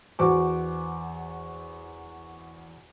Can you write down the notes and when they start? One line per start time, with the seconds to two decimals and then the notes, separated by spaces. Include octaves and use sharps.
0.19 E2 F#4 C5 D6